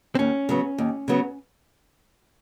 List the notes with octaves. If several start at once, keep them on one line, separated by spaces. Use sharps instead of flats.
C4
D#2 C#4
C#3 F#3 B3
D#2
C#3 F#3 B3